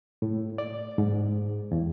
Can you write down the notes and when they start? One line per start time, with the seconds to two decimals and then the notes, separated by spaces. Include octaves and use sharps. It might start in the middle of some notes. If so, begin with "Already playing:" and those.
0.22 A2
0.58 D5
0.98 G#2
1.72 E2